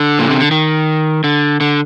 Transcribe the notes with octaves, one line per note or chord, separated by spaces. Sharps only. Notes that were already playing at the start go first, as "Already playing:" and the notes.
Already playing: D3
A#2
C3
D3
D#3
D3
D3